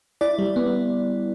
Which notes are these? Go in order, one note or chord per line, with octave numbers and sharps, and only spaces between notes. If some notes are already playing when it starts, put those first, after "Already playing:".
E4 D5
G3
B3